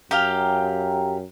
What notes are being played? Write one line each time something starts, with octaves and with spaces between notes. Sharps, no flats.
F#2 G4 F5 G5 A#5